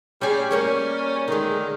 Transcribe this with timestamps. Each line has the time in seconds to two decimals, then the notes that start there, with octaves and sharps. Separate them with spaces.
0.21 G3 C#4 G#4
0.51 G3 A#3 C#4 C#5
1.28 D3 D#3 G#3